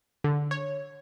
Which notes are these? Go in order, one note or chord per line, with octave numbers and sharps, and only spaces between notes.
D3
C#5